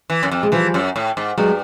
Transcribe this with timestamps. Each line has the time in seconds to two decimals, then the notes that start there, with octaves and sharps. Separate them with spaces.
0.10 E3
0.23 F#2
0.31 F2
0.43 G#3
0.52 E3 F3 G3
0.74 F#2
0.96 A2
1.17 G#2
1.37 G2 F#3 G#3